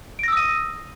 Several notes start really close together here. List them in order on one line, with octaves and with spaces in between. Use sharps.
D7 A#6 E6 D#6 D#7